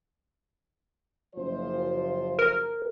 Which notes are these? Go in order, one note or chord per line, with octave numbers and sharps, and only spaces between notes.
F#1 F3 C5
A#4